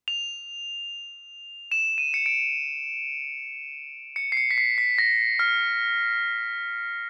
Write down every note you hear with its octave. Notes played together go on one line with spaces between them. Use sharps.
F7
E7
D#7
C#7
D7
C#7
C7
C#7
B6
C7
B6
A#6
F6